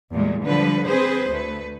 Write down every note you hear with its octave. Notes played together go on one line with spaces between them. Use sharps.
E2 A#2 G3 G#3
D3 F3 G3 B4
C4 G#4 B4 C5
D2 A3 B4